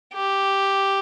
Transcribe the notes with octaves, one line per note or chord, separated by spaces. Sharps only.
G4